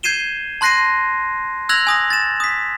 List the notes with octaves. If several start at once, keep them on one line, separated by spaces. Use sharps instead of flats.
G6 G#6 C7 D#7 E7 G7
A5 C6 F#6 A#6 C7 D#7
E6 F#6 G#6 A#6 F7 F#7
G#5 D#6 A#6
A6 E7
D#6 B6